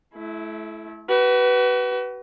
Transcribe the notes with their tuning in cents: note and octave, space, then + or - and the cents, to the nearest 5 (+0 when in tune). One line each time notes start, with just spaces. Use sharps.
A3 -35 E4 +10
F#4 +35 B4 +0